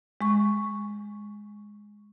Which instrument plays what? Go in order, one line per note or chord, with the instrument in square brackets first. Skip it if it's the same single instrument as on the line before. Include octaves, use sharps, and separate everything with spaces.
[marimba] G#3 C#6